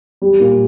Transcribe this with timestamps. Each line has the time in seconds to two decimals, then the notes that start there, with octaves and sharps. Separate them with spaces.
0.22 G3
0.40 A#2